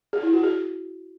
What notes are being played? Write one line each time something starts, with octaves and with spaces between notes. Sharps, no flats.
G#4
E4
F#4
G#4